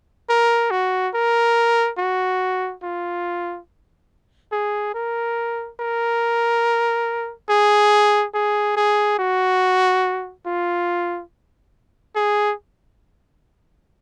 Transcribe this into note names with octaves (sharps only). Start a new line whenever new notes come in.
A#4
F#4
A#4
F#4
F4
G#4
A#4
A#4
G#4
G#4
G#4
F#4
F4
G#4